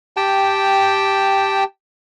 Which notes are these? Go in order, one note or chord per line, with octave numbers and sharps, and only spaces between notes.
G4 G5 A5